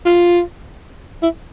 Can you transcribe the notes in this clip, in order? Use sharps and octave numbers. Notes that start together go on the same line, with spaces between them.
F4
E4